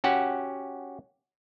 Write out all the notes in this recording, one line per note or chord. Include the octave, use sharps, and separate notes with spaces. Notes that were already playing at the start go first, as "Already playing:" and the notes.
C#4 F#4 G4 F#5